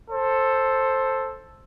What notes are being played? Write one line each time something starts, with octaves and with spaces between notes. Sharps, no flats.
A4 C5